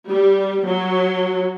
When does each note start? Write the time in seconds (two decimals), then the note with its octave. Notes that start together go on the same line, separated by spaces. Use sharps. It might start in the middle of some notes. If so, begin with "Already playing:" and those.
0.10 G3
0.66 F#3